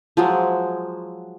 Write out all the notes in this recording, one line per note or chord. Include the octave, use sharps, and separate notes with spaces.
F3 F#3 G#3